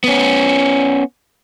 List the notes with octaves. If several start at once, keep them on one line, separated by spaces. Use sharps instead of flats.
B3 C#4